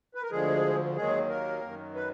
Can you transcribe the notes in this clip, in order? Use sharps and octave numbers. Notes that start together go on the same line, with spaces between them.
B4
A#4
D2 D3 F3 G#3 G#4
D#2 D#3 F#3 G#3 G#4
A#3 A#4
F#2 D#3 F#3
B4